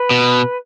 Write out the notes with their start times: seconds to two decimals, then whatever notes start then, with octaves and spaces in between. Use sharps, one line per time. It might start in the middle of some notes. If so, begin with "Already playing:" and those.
Already playing: B4
0.11 B2